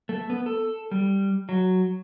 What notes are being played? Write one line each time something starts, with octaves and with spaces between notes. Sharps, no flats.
A3
B3
A4
G3
F#3